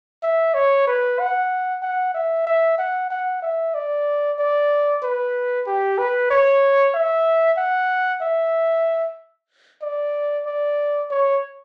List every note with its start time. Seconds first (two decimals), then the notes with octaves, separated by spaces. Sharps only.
0.23 E5
0.54 C#5
0.87 B4
1.19 F#5
1.82 F#5
2.14 E5
2.47 E5
2.78 F#5
3.10 F#5
3.42 E5
3.74 D5
4.39 D5
5.03 B4
5.67 G4
5.98 B4
6.31 C#5
6.94 E5
7.58 F#5
8.22 E5
9.82 D5
10.46 D5
11.10 C#5